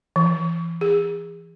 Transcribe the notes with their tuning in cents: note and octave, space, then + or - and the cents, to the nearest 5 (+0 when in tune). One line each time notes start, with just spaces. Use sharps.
E3 +25
G#4 -25